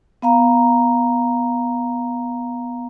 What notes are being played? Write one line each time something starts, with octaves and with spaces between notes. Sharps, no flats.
B3 F5 A#5